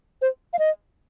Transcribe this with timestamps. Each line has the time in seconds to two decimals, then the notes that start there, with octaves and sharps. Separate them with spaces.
0.22 C5
0.53 F5
0.59 D#5